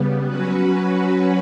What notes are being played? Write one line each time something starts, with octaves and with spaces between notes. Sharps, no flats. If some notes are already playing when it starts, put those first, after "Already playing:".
Already playing: C#3 G3 B3
F#3 C#4 F#4 B4